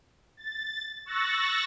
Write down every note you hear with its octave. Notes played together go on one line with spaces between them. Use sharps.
A6
C#6 E6 F#6 A6 A#6